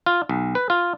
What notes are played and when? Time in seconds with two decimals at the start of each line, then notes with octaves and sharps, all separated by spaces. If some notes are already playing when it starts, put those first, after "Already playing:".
0.06 F4
0.29 B1
0.55 B4
0.70 F4